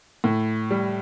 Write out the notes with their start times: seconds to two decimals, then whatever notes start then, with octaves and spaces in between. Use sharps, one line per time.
0.24 A2
0.71 G3